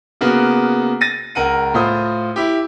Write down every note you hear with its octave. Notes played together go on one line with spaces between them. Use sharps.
C#3 A#3 B3 F#4
A6 A#6 D#7
C#2 A#4 F#5 D#7
A2 F4 C5 D#6
E4 G4